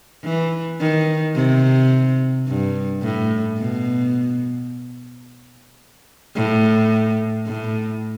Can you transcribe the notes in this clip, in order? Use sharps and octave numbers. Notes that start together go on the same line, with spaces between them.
E3
D#3
C3
G2
A2
B2
A2
A2